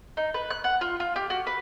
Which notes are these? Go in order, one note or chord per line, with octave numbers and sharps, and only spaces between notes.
D#4
B4
F#6
F#5
F4
F4
G4
F#4
B4